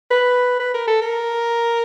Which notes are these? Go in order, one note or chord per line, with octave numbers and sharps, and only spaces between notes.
B4
B4
A#4
A4
A#4